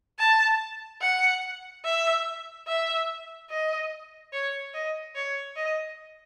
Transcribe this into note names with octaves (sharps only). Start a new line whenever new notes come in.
A5
F#5
E5
E5
D#5
C#5
D#5
C#5
D#5